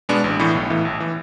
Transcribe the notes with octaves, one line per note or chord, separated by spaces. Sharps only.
B2 G#3 B3 D4
A1
A2 E3 B3
B1
A2 E3
A1
E3